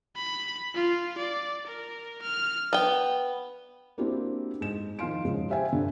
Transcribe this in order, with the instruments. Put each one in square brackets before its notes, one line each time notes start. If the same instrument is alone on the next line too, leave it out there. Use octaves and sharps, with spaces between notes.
[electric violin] B5
F4
D5
A#4
F6
[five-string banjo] B3 G5
[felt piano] A#3 C4 D4 E4 F#4 G4
G#2 E7
D#3 F3 F4 F5 C6 D7
G#2 C#3 F3
G4 C5 E5 F5 G5 G#5
G2 D3